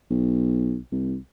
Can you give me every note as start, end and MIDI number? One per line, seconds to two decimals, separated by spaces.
0.10 0.78 35
0.92 1.17 36